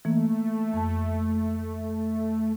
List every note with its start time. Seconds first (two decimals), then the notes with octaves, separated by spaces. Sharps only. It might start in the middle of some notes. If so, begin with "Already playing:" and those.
0.05 E3 A3 A#3
0.73 F2 A5